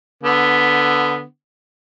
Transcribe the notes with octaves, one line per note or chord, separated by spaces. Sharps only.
D3 B3